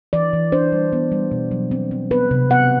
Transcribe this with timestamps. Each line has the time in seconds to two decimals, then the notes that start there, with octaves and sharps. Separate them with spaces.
0.13 E3 D5
0.33 E3
0.52 D4 C5
0.72 G3
0.93 B3
1.12 G3
1.31 B2
1.51 F#3
1.71 C4
1.91 C4
2.11 B3 B4
2.31 C3
2.50 B3 F#5